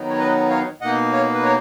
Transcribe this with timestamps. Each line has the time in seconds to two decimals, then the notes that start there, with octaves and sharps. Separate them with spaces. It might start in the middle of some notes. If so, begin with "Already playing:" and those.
Already playing: D#3 F#3 B3 D#4
0.09 C#5
0.18 B4 D#5
0.50 C#5 F5
0.81 B2 A#3 D#4 D#5 F#5
1.12 C#5 F5
1.34 B4
1.43 A#4 C#5